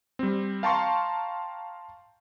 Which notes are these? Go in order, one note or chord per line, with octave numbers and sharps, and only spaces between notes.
G3 C4
F5 G5 A5 A#5 C6 C#6